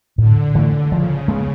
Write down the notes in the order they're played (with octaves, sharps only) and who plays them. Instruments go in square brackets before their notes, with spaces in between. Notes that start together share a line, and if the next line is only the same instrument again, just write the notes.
[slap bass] A2 [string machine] D3
[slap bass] E3 A3
[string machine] C#3 [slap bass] F3
[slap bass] G#3 B3